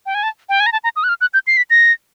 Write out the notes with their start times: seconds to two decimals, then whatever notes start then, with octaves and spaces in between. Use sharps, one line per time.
0.06 G5
0.15 G#5
0.23 A5
0.49 G5
0.60 G#5
0.66 A#5
0.72 A5
0.84 A#5
0.96 D#6
1.04 F#6
1.09 F6
1.21 F#6
1.34 G6
1.47 C7
1.57 B6
1.70 A#6